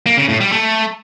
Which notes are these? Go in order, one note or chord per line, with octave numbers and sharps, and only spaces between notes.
A#3
C#3
A2
G3
A3